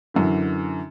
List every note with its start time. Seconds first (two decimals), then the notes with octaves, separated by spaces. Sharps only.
0.14 F#2 D3 E3